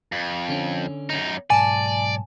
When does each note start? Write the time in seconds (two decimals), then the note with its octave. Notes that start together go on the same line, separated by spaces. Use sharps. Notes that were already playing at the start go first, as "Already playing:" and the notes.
0.12 F2
0.49 D3 C#4
1.10 F#2 D#4
1.50 B1 G#2 D5 G#5 A5